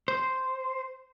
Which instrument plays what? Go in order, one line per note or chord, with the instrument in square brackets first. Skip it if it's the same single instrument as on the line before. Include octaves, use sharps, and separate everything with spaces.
[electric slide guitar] C5